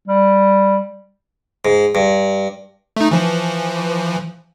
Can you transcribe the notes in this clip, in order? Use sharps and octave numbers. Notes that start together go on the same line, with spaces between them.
G3
G#2
G2
A3 D#4
E3 F3